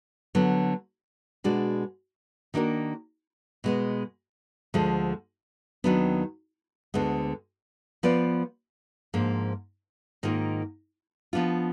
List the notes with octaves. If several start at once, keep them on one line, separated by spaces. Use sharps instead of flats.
D3 F#3 B3
B2 G#3 D4 F#4 D5
D#3 A#3 D4 F#4 A#4
B2 G#3 B3
D2 D3 F3 G#3
D#2 D#3 F#3 B3 D4
D2 D3 G#3 B3
F3 B3 F4 B4 D5
G#2 F3 A#3 D4
G#2 D#3 A#3 F4
F3 B3 D4 F4